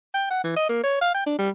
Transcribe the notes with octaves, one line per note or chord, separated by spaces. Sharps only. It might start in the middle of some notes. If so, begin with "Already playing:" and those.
G5
F#5
E3
D#5
A#3
C#5
F5
G5
D4
G3